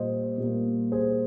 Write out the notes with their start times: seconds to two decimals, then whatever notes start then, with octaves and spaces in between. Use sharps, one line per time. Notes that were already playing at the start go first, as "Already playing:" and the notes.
Already playing: A#2 G3 A#3 C5 D#5
0.38 A#2 G3 A#3
0.92 G#4 C5